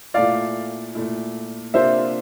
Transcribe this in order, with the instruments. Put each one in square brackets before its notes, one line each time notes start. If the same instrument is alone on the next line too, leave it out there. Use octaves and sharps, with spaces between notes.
[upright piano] A#2 A3 E4 [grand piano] D5 F5
[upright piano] A#2 A3 E4
[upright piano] C3 F3 A#3 D4 F4 [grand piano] C5 E5